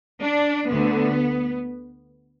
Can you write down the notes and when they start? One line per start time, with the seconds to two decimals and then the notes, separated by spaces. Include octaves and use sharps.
0.22 D4
0.68 D2 D3 B3